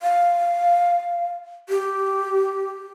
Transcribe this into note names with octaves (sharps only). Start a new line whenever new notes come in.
F5
G4